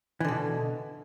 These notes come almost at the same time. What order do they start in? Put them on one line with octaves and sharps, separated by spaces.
E3 D3 B2